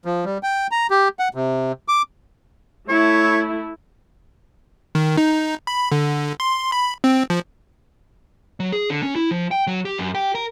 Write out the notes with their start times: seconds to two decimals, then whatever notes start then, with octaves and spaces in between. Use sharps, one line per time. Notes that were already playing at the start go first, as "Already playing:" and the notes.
0.05 F3
0.25 G3
0.43 G5
0.71 A#5
0.90 G4
1.19 F#5
1.34 C3
1.88 D6
2.89 A3 E4 C#5
4.95 D#3
5.17 D#4
5.67 B5
5.92 D3
6.40 C6
6.72 B5
7.04 C4
7.30 F3
8.60 F#3
8.73 G#4
8.90 D3
9.03 C#4
9.15 E4
9.31 F3
9.51 G5
9.67 F#3
9.85 G4
9.98 F#2
10.15 G4
10.35 A#4